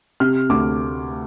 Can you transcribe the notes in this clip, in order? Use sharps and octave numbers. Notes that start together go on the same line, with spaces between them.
C3 F6
D2 D6